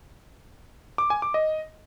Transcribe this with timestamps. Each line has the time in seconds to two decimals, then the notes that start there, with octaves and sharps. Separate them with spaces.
0.98 D6
1.10 G#5
1.22 D6
1.34 D#5